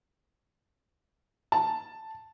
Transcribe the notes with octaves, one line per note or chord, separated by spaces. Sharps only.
A5